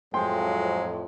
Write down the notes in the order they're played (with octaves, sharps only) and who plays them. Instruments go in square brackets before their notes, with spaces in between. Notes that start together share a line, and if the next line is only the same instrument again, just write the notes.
[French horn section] F2 A2 [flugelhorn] F#3 [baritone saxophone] G#3 [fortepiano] G5 C6